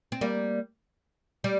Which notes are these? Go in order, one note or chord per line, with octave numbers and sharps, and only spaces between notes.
C4
G3 A#3
G3